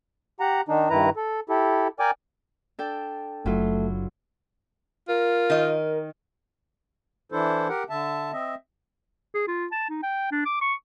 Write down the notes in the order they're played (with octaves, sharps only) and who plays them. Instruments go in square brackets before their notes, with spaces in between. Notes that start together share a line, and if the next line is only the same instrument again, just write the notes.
[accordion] G4 F#5 A#5
D#3 D4 D#4
G2 D#3 E4 B4 A#5
A4
E4 G4 A4
A#4 D5 G5 G#5 D6
[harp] D4 A4 G5
[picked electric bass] F#1 [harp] F#3 E4 F4 [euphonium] A3
[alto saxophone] F4 [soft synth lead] A#4
[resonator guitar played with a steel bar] D#3 D#5
[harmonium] E3 D4 E4 A4 C5
G4 A#4 F#5
D3 E5 A5
C4 D#5 E5
[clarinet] G#4
F4
A5
D#4
G5
D4
D6
C#6